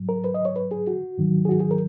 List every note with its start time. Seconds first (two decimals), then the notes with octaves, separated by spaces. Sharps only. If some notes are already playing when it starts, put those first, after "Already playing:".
Already playing: G#2 F#3
0.09 A#4
0.24 B4
0.34 D#5
0.45 C#5
0.56 B4
0.71 G#4
0.87 F#4
1.18 G#2 D#3 F#3
1.45 G#4
1.49 F#4
1.60 G#4
1.71 A#4